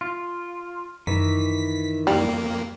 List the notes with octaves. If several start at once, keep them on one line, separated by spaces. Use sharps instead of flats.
F4
F#2 D#3 E3 B6
F2 G3 A#3